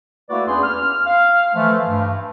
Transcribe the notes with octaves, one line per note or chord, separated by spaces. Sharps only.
A3 A#3 E4 F#4 B4 D5
E2 C#4 D4 G#4 B4 C6
F6
F5
E3 F3 A3
G2